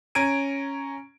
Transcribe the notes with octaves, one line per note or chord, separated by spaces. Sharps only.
C#4 A#5 G#6 D7 D#7